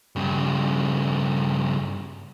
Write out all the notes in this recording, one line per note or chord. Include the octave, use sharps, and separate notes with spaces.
G2 C#3